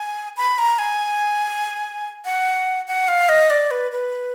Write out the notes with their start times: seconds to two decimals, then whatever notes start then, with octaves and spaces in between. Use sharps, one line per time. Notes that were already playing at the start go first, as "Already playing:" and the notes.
Already playing: G#5
0.37 B5
0.58 A#5
0.78 G#5
2.25 F#5
2.87 F#5
3.08 F5
3.29 D#5
3.50 D5
3.71 B4
3.92 B4